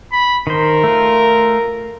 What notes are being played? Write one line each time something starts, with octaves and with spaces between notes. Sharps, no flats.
B5
D#3 A#4 C5
A3 F4